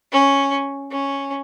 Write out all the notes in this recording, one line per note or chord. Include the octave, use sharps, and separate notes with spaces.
C#4
C#4